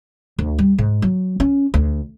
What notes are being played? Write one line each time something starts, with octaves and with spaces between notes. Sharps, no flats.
D2
G3
G#2
F#3
C#4
D2